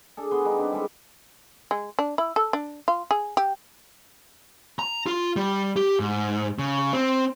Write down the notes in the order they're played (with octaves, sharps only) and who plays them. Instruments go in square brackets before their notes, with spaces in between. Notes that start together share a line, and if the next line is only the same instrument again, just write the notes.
[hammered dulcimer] D4 G#4 A4
B3 G#4 G#5 C6
G3 D4 D#4
C4 D4 B4
G3 G#3 A4 B4
[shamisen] G#3
D4
E4
A4
D4
F4
G#4
G4
[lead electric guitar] A#5
F4
G3
G4
G#2
C#3
C4